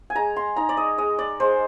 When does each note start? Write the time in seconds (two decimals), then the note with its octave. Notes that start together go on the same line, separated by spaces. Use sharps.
0.10 G#5
0.15 G#3 A#5
0.36 C6
0.56 D#4 A#5
0.69 D5
0.77 D#5
0.98 G#3 D#5
1.19 D5
1.40 G#3 C5